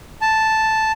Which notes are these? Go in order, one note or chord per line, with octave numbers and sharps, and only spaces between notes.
A5